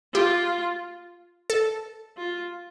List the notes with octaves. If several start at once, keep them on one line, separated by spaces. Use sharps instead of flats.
F4 G4
A4
F4